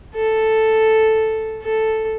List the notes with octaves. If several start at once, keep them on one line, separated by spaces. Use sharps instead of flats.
A4
A4